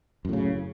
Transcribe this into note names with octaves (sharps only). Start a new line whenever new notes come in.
F#2 A2 C#3